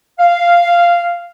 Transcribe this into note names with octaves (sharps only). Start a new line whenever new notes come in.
F5